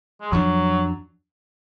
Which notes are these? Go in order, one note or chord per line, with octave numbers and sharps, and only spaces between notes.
G#3
F2 F3 F#3 B3 D4